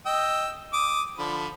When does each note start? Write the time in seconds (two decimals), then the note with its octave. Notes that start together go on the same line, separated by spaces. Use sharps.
0.06 D#5 G5 E6
0.73 D6 D#6
1.18 D3 F3 B5